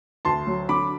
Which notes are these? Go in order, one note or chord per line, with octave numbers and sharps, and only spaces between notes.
D2 A5 C6
F#3
D3 B5 D6